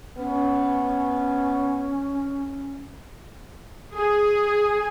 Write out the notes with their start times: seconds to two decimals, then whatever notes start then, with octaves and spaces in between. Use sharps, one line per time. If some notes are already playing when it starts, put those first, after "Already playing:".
0.17 B3 C#4
3.93 G#4